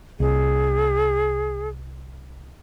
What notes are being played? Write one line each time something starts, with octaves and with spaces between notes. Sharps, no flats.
C2 G#4